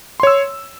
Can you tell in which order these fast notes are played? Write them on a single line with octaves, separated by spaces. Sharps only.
C6 C#5 E6